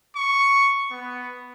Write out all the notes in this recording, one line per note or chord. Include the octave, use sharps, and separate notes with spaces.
C#6
B3